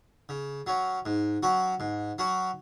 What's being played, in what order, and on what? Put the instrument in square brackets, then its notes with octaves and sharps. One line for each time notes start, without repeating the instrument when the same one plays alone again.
[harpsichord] C#3
F#3 C#4
G#2
F#3 C#4 F#4
G#2
F#3 C#4 F#4